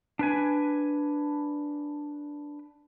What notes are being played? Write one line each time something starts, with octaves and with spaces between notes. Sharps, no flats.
D4 B4 G#5